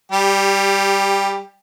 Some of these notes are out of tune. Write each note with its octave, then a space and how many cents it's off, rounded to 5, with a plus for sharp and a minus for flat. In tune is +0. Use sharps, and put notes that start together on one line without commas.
G3 +0 G4 +20